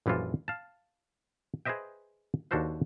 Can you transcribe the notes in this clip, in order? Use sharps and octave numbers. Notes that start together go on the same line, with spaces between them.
A#1 F#2 E3 G3 F4 A4
F5 A5
G#4 B4 C5 D#5 E5 G5
D#2 D4 F#4 A4 C5 F5